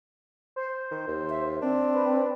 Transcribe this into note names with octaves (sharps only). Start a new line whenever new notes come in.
C5
D#3
D#2
E5
C4 D4
B4